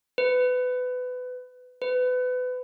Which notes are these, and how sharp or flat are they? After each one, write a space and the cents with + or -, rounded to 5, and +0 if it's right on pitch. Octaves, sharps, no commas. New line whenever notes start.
B4 +25
B4 +30